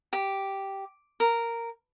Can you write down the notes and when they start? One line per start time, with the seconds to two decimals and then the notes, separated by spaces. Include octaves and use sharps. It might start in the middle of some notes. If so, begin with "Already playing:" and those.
0.13 G4
1.20 A#4